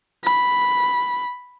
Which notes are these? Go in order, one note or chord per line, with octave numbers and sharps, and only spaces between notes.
B5